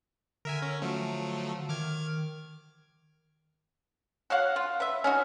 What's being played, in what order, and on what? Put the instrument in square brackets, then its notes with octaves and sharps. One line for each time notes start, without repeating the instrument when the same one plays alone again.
[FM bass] D3 [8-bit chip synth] A#4 E5 G#5
[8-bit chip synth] C#4
F3 F#3 A3
[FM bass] D#3 [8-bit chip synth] D6 F6 G#6
[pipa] F#4 C#5 F5 F#5
F4
B4 E5
C#4 D#4 F#4